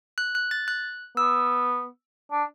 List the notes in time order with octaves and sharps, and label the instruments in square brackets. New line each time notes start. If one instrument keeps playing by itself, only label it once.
[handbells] F#6
F#6
A6
F#6
[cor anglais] B3 [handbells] E6
[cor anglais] D4